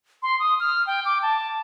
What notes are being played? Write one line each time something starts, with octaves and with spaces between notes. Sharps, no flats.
C6
D#6
F6
G5
D6
A5